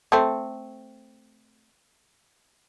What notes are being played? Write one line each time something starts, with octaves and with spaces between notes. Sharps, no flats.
A3 C4